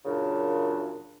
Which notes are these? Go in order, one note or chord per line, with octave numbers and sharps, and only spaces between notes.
F#2 A#2 C#3 D4